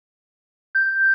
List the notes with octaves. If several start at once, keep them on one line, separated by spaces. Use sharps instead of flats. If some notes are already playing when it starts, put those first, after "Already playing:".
G6